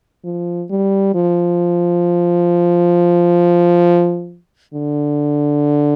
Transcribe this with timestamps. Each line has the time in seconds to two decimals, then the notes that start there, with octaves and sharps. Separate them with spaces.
0.24 F3
0.70 G3
1.15 F3
4.74 D3